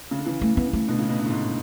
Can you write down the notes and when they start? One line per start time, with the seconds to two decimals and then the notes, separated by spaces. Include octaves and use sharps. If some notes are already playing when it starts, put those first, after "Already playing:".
0.11 C#3
0.18 D3
0.26 C#3 E3
0.41 A3
0.57 B3
0.73 A3
0.88 B2 D3
0.99 A2 C#3
1.09 B2 D3
1.20 B2 D3
1.26 A2
1.30 G#2